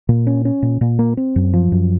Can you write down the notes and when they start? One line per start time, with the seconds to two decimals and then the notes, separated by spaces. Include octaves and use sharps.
0.09 A#2
0.27 C#4
0.45 C#4
0.62 A#2
0.81 A#2
0.99 A#3
1.17 C4
1.36 F#2
1.53 F3
1.72 F#2